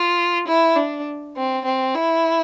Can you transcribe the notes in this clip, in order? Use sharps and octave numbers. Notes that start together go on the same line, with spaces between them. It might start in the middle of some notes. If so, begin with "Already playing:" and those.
Already playing: F4
E4
D4
C4
C4
E4